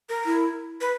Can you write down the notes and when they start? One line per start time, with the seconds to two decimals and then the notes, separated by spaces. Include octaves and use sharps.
0.09 A#4
0.25 E4
0.81 B4